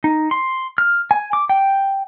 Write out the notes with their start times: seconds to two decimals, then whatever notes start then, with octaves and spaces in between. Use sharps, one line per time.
0.04 D#4
0.31 C6
0.78 F6
1.11 G#5
1.33 D6
1.49 G5